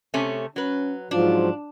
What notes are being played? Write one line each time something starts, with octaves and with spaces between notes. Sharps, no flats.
C3 A3 C#4
F#3 C#4 B4
G#2 F3 F#3 D4 F4